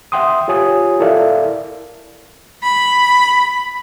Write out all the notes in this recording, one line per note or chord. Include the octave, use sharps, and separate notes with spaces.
E5 F#5 G5 C6 D#6
F4 G4 C#5 G#5 D#6
E4 A4 A#4 D5 E5 F5
B5